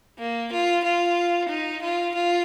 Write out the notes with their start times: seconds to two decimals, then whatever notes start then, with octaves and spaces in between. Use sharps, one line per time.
0.19 A#3
0.52 F4
0.84 F4
1.49 D#4
1.82 F4
2.14 F4